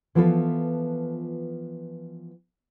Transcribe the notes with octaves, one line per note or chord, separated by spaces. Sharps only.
E3 F3 B3 F4 A4 B4